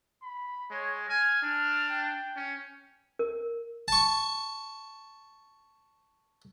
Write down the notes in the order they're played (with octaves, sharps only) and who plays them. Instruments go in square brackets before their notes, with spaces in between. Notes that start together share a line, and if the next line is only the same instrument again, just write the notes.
[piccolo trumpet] B5
[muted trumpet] G#3 [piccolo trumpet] C#5
[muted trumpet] G#5 [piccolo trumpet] F6
[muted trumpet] D4
[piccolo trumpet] G5
[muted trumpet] C#4
[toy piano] A#4
[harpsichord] A5 C#6